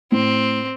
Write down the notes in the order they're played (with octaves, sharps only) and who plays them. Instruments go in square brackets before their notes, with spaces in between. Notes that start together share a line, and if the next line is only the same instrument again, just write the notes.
[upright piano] A2 [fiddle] C4